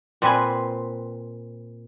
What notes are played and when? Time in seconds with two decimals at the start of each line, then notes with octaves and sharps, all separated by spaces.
0.22 A#2 C4 B4 G#5 B5